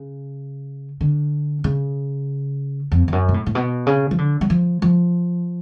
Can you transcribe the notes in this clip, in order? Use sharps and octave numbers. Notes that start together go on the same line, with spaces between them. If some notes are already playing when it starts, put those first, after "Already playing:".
Already playing: C#3
D3
C#3
F2
F2
F#2
B2
A2
A2
B2
C#3
F3
D3
F#3
F3
F3